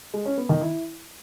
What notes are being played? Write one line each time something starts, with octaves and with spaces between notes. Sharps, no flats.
G#3
C#4
B3
D#3
E4